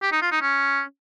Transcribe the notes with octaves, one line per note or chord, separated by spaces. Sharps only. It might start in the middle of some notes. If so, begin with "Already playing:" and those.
G4
D#4
F4
D#4
C#4